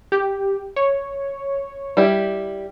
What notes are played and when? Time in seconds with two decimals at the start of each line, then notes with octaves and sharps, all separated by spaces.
0.12 G4
0.76 C#5
1.97 G3 E4 G4